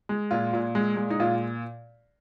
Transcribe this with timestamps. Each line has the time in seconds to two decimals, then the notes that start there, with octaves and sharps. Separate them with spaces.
0.09 G#3
0.31 A#2 F4
0.53 A#2
0.75 G#3
0.97 G#3
1.10 D#4
1.20 A#2 F4